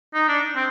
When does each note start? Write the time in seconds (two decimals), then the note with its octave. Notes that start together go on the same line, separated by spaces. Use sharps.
0.14 D#4
0.28 D4
0.55 C4